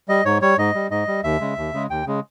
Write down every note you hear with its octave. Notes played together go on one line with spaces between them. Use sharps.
G3 D#5
G#2 C#5
G3 C#5
G#2 D#5
G3
G#2 D#5
G3
D#2 E5
C#3 G#3
D#2
C#3 G#3
D#2 G5
C#3 G#3